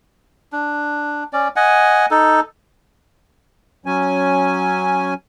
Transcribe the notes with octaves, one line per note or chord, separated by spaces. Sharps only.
D4
C#4 D5
D#5 F#5 G#5
D#4 A4
F#3 C#4 G#5